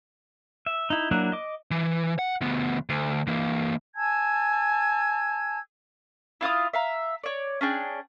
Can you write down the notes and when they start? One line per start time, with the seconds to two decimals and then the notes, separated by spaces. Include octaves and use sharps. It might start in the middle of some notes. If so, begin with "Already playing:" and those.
0.66 E5
0.90 D#4 E4
1.11 F#3 A#3 D4 E4 F#4
1.32 D#5 D6
1.71 E3
2.19 F#5
2.41 D2 B3
2.89 D2
3.27 E3 A#3
3.96 G#5 A5 E6 G#6
6.41 E4 F4 F5 D#6
6.73 E5 F5 A#5
7.24 C#5 D5
7.61 C#4 D4 G#4 G5